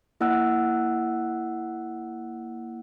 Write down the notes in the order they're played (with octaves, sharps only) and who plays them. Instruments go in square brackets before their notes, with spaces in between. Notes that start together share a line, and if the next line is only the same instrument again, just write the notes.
[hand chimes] A#3 E4 D5 F#5 E6 F#6